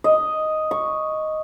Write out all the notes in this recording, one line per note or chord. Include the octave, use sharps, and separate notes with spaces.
D#5
C#6